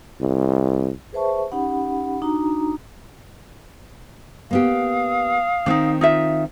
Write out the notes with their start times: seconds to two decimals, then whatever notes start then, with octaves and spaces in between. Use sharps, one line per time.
0.20 C2
1.13 G#4 B4 C5 E5 A5 C#6
1.52 C#4 D#4 G4 F#5 B5
2.22 D4 D#4 F#4 A#5
4.51 A#3 B3 G4 F5 D#6
5.66 D#3 C4 D4 D#4
6.01 D#4 F4 E5